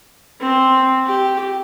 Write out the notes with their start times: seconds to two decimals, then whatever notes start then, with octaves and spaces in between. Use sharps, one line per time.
0.40 C4
1.06 G4